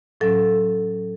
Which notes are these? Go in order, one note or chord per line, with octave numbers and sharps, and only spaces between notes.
A2 F#3 C#4 A4